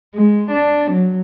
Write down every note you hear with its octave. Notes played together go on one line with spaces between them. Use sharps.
G#3
D4
F#3